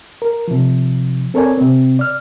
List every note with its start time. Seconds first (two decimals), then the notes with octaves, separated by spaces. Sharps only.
0.22 A#4
0.48 C3 F3
1.34 C4 A4 A#4 C#5 D5 G#5
1.57 C3 C4
1.99 D5 F6